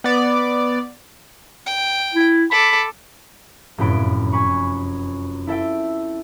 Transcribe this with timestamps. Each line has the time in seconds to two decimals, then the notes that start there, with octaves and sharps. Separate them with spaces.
0.04 B3 D5
1.67 G5
2.14 E4
2.51 A4 B5 D6
3.78 F1 F#2 A2 G5 B5 D7
4.32 G#5 B5 C#6
5.47 E4 A4 E5 G5